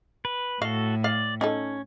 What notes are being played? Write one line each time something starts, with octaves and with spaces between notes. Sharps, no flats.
B4
A2 F#4 A4 F5
D5 F5
C#4 D#4 F4 A4